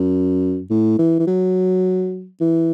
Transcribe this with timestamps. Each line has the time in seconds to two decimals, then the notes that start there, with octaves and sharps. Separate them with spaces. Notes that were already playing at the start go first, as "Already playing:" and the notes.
Already playing: F#2
0.70 A2
0.99 E3
1.19 E3
1.27 F#3
2.41 E3